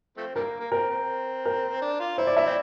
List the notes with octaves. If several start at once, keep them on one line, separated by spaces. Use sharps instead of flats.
F3 A3 C4
D3 G3 A#3 A#4
A#3
C4 A#4
C4
A#4
D4
F4
E4 C5
D5
E4 E5
C4 D5